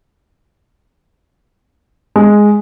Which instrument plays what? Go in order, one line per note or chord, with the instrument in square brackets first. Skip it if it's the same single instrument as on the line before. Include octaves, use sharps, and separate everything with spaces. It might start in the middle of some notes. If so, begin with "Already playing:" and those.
[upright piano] G#3